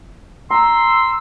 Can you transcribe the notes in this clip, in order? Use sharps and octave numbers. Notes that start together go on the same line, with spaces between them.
A#5 C6 E6